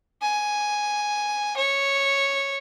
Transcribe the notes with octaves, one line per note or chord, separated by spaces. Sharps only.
G#5
C#5